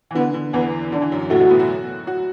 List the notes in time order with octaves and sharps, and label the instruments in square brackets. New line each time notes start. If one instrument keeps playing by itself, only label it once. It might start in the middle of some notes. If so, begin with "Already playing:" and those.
[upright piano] E3
[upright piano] D3 [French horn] B3
[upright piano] D3
[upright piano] E2 E3 [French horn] B3
[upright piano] D3 [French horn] D4
[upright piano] E3
F#2 F#3
[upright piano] A2 A3 [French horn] F#4
[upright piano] A2 A3
B2 B3
F#3 F#4
F#3 F#4